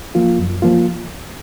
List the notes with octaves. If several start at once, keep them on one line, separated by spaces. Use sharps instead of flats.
F3 A#3 F4
F#2
F3 A#3 F4